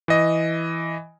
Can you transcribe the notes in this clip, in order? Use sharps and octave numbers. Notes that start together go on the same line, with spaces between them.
E3 D#5